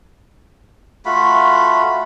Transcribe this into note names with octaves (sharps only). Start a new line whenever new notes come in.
A3 F4 F#4 B5